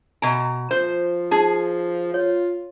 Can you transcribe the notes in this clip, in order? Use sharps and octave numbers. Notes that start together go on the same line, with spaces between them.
B2 G#5 A#5
F3 C5
D#4 G#4 A5
F4 C#5